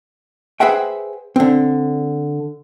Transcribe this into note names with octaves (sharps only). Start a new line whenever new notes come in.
G#4 B4 C5 E5 F#5 G5
D3 C4